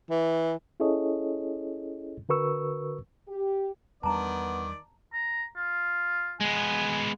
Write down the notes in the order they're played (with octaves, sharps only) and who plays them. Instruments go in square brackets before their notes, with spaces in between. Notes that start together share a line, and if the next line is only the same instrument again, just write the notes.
[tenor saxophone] E3
[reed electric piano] C#4 E4 G#4 A4 C#5 D#5
D3 F#4 A#4 B4 C#6 E6
[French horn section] G4
[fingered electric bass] E2 G3 D4 [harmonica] D#3 D5 [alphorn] B3 [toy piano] A5 A#5
[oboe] A#5
F4
[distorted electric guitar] G#3 B3 [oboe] G#5